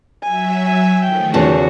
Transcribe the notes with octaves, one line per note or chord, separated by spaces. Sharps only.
F#3 E5 G#5
G#5
D#3 F3 A3 G5
E2 C#3 F#4 A5